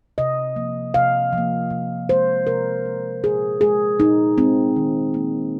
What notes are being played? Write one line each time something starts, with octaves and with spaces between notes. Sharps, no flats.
C3 D#5
F3 A#3
C3 F5
F3 A#3
C3
G#3 C5
C3 A#4
G#3
A#2 G#4
G#3 G#4
A#2 D#4
G#3 C4
D#3
A#3